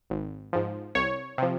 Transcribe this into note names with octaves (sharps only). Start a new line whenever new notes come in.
G#1
G#2 F3
C2 C#5
C3 F3